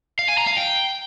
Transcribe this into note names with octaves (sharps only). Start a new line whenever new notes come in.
F5
G#5
A#5
F5
G5